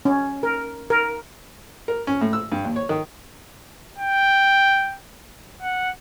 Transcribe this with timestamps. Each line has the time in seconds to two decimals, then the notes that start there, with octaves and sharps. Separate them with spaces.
0.05 C#4
0.43 A#4
0.90 A#4
1.88 A#4
2.07 C#4
2.21 A2
2.33 E6
2.52 G2
2.64 D#2
2.76 C#5
2.89 D#3
3.98 G5
5.63 F#5